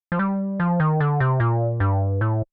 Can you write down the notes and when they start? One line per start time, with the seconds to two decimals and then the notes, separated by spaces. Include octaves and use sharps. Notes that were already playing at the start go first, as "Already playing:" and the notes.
0.12 F3
0.19 G3
0.60 F3
0.80 D#3
1.00 D3
1.20 C3
1.40 A#2
1.80 G2
2.21 A2